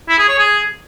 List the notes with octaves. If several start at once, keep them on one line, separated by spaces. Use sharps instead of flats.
E4
G#4
C#5
G#4